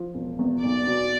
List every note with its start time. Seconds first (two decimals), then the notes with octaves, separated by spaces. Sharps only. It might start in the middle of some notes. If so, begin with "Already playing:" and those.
Already playing: F3
0.14 E1
0.39 E2
0.62 B1 D5
0.87 B2